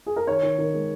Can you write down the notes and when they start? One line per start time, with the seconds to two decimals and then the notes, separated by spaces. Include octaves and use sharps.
0.06 G#4
0.16 A#4
0.27 D#3 C#5
0.43 D#3
0.58 D#3
0.73 G#3